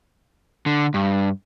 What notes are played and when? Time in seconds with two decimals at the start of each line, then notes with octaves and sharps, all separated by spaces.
0.66 D3
0.94 G2